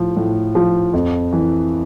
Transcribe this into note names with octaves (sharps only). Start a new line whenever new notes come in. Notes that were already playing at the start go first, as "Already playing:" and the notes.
Already playing: A2 F3
A2
F3
F2
E3